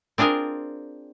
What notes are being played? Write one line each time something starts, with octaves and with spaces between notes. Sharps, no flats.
C4 D4 F4 G#4 A#4